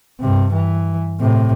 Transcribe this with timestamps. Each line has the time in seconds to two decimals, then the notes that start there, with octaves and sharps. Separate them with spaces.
0.20 G2 C3
0.53 E3
1.20 A2 C3